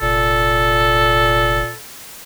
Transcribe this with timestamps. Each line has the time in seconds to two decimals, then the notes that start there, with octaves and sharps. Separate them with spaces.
0.01 F1 A#2 A4